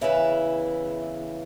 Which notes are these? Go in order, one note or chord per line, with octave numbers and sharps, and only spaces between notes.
E2 C#3 E3 E4